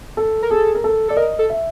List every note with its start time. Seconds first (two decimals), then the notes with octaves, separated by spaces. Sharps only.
0.17 A4
0.42 A#4
0.51 G#4 A4
0.75 A#4
0.84 A4
1.08 A4 D5
1.17 A#4 D#5
1.39 A4
1.50 E5